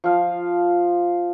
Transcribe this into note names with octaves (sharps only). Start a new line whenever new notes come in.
F3 F5